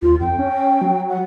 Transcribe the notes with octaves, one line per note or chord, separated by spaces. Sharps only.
D#2 F4
F2 G5
C#4
F#3
F#5